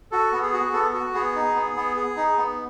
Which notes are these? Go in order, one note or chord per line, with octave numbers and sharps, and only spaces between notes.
F#4 A4
B3
G#4
F#4
B3 A4
F#4
B3 G#4
D#4
B3
B3
G#4
D#4
B3